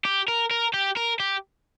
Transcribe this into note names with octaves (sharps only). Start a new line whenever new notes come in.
G4
A#4
A#4
G4
A#4
G4